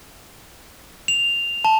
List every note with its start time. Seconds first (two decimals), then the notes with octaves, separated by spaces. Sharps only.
1.08 F7
1.65 A5